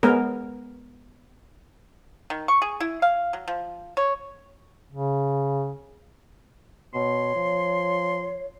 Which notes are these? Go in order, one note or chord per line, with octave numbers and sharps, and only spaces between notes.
G#3 B3 A#4
D#3
C#6
G#4
E4
F5
F#3
F3
C#5
C#3
B2 C#5 C6
F3